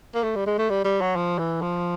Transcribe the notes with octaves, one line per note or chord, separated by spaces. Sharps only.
A#3
A3
G3
G#3
A3
G3
G3
F#3
F3
E3
F3